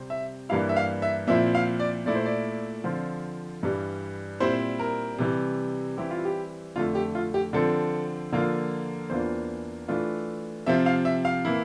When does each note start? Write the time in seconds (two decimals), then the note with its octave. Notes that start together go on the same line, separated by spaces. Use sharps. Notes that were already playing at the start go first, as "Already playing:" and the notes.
Already playing: C3 G3 C4
0.10 E5
0.49 G2 E3 G3 A#3 E4 F5
0.69 E5
0.76 F5
1.02 E5
1.27 A#2 F3 C4 E4 E5
1.55 F5
1.79 D5
2.06 A#2 A3 E4 D5
2.15 C5
2.26 D5
2.84 D3 F3 C4 F4
3.63 G2 E3 G3
4.40 A#2 G3 C4 E4 C5
4.79 A#4
5.19 C3 E3 G3
5.98 E3 G3 C4 E4 G4
6.11 F4
6.25 G4
6.76 F2 D3 A3 F4
6.95 G4
7.15 F4
7.34 G4
7.53 D3 F3 C4 A4
8.32 D3 F3 A#3 F4
9.10 E2 E3 A#3 D4 F4 C5
9.88 E3 A3 D4 F4
10.66 C3 F3 C4 F4 E5
10.86 F5
11.05 E5
11.25 F5
11.45 E3 A#3 E4